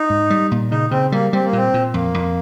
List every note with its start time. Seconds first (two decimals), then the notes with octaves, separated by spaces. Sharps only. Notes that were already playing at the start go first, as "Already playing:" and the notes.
Already playing: D#4
0.10 G#2
0.30 G3
0.51 A#2
0.71 C#3 D#4
0.91 C#3 C4
1.12 G3 A#3
1.33 G3 C4
1.45 A#3
1.53 A#2 C4
1.74 A#2
1.94 F2 A#3
2.14 F2